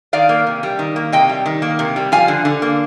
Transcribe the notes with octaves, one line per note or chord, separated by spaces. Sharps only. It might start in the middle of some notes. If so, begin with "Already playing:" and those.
D#3 D5 F5
A#3
C3
G3
D#3
A#3
C3 D#5 G5
G3
D#3
A#3
C3
G3
F3 F5 G#5
D3
D3
A#3